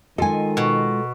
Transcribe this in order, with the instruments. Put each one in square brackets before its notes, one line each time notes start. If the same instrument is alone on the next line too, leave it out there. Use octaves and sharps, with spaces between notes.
[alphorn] D#3 [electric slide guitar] G#3 F4 D#5 [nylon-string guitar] A4 G#5
[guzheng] B2